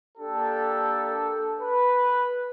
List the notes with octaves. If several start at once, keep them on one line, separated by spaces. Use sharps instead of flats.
A#3 D4 G4 A4
B4